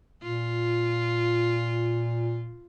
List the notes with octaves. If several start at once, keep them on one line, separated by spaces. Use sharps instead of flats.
A#2 F4